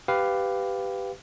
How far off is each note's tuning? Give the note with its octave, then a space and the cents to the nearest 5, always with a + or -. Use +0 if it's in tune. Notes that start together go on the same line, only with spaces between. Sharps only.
G4 +0 B4 +15 F5 +0